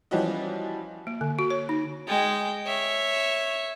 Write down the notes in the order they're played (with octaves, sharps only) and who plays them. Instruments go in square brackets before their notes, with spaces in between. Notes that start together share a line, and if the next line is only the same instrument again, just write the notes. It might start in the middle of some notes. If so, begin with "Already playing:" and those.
[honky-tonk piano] E3 F3 G3 C#4 F#4 D#5
[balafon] A#3
D3
F#4
C#5
D#4
[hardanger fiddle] G#3 G5
C#5 E5